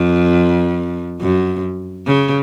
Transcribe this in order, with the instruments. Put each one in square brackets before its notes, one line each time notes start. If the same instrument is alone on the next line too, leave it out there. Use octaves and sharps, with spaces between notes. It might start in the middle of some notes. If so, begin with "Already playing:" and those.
Already playing: [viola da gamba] F2
F#2
C#3